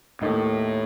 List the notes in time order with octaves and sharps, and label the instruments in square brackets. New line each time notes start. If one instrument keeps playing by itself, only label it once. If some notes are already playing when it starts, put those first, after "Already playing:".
[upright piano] D#2 D#3 A3 D#4 [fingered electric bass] A2